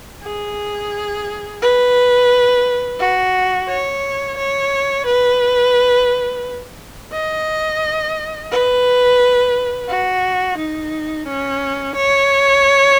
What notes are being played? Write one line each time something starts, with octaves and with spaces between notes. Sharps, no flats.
G#4
B4
F#4
C#5
C#5
B4
D#5
B4
F#4
D#4
C#4
C#5